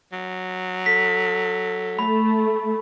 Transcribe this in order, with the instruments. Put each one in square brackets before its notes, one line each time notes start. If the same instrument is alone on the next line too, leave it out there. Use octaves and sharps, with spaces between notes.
[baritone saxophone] F#3
[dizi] A4 [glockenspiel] B6
[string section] A3 [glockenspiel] B5